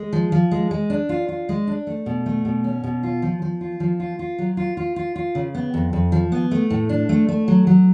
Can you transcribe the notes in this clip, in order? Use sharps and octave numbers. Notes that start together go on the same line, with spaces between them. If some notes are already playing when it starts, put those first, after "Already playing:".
Already playing: G#3
F3
F3
G#3
G#3
D4
F4
F4
G#3
D4
A3
B2
A3
B2
C#4
B2
F4
F3
F3
F4
F3
F4
F4
F#3
F4
F4
F4
F4
C#3
B3
F2
F2
F3
B3
A3
A2
D4
A3
A3
F#3
F#3